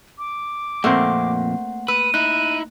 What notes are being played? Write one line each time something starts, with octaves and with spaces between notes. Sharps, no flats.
D6
F2 A#2 A3 A#3 C4 F#5
B4 E6 D#7
D#4 E4 F#6